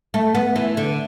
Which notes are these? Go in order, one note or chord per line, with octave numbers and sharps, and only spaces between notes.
A3
B3
E3
D3